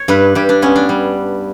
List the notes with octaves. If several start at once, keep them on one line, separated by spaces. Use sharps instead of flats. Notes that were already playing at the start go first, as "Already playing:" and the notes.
Already playing: C#5
G2 B4
G2 G4
D4
B3 C#4
D4
G3